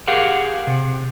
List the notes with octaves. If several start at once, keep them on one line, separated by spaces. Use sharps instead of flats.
G4 G#4 A#4 F5 F#5
C3